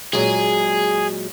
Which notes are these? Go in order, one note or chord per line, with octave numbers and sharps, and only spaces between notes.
A#2 F#3 G#3 G#4